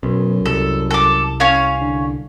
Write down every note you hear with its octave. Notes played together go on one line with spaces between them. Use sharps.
B1 F#2
C2 A4
A4 D6
C#4 C#5 F5
D3